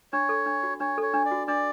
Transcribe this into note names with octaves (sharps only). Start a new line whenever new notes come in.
D4 C#5
A4
D4
F#4
D4 C#5
A4 C#5
D4
D5
F#4
D4 D5